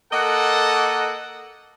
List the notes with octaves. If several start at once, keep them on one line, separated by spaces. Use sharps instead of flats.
A#3 A4 D#5 F#5